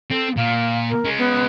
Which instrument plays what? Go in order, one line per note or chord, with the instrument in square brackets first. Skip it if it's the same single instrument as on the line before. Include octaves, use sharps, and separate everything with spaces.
[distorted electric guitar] C4 [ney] A4
[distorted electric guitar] A#2 [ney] F5
[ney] A#4
[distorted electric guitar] G#3 C#4
[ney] B3